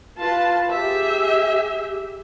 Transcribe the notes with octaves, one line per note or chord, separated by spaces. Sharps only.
F4 B4 A5
G4 G#4 E5